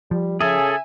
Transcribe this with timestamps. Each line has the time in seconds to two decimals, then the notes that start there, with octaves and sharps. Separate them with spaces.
0.11 F3 G3
0.41 C#3 G#4 A4 E5 G#5